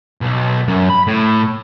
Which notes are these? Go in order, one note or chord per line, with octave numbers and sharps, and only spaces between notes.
B1
F#2
B5
A2